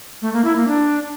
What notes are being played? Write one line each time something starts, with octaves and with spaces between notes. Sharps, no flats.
A3
A#3
E4
A#3
D4